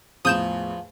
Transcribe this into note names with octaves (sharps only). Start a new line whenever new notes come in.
E2 A2 F3 D#6 G6 E7